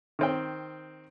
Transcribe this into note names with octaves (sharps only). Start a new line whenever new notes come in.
D#3 C4 G5